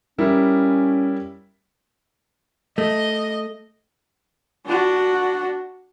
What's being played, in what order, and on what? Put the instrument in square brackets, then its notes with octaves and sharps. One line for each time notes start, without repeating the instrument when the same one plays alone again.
[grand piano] G3 E4 A#4 [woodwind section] C#4
[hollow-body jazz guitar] A3 [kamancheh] D#5
[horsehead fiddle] D4 F#4